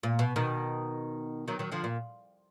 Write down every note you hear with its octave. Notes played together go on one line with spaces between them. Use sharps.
A#2
B2
B2 D#3
D#3 F#3
D#3 F#3
D3 F3
A#2